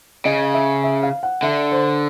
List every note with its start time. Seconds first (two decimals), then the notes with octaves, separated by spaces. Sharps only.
0.25 C#3 D#5
0.54 E5
0.84 E5
1.03 F5
1.23 F#5
1.43 D3 E5
1.72 C5